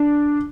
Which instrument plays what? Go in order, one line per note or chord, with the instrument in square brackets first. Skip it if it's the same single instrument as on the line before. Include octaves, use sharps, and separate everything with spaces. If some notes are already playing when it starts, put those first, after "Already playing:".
Already playing: [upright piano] D4